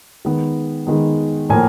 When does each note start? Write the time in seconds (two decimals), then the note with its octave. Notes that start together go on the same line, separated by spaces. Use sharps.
0.25 D#3 G#3 B3
0.87 D#3 G#3 B3
1.49 A2 F3 A#3 G#5